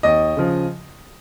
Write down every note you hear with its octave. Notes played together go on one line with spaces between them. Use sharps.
D#2 D#5
C#3 F3